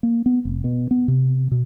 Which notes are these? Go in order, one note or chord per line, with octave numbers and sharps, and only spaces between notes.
A#3
B3
F1
B2
B3
C3
B2